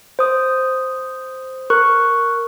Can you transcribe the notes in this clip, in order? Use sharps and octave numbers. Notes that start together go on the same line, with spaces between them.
C5 D#6
A#4 C#6 F#6